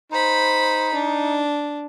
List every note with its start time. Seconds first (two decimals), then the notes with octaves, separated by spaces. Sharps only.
0.12 D#4 C5 B5
0.94 D4